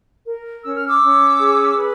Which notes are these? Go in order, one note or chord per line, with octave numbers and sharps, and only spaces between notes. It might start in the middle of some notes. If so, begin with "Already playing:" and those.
A#4
C#4 E6
F6
D6 E6
C#4
G#4
B4